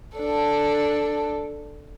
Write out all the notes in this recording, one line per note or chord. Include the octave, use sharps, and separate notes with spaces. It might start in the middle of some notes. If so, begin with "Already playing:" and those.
D4 A4